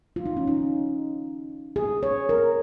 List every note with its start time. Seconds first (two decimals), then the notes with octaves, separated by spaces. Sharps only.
0.16 F4
0.26 D#4
0.37 C#4
0.47 D#4
1.76 G#4
2.03 C#5
2.29 A#4